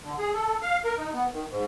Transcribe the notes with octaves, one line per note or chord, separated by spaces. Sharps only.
D3
G#4
A4
F5
A#4
D#4
B3
D#3
G#2